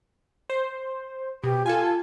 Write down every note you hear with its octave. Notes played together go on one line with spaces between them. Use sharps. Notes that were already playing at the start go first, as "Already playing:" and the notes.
C5
B2 G4
F4 A4 G#5